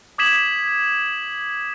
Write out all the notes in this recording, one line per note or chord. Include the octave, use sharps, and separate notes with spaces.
D6 D#6 G#6 B6 E7 F#7